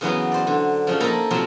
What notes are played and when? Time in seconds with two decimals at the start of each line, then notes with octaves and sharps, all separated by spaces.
0.01 C#3 E3 F#3 B3
0.32 C5 D5
0.47 D3
0.87 C#3 F3
1.00 A#3 D#4 A4 A#5 B5
1.31 C3 F3 F#3 C4